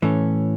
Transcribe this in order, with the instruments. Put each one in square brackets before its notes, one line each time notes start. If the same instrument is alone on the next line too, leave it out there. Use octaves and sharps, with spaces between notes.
[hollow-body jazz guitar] A2 E3 A3 C#4